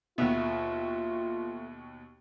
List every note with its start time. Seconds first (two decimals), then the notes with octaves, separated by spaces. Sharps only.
0.18 D#2 B2 A3 B3 F4 E5